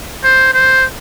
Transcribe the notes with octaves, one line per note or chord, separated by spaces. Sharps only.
C5
C5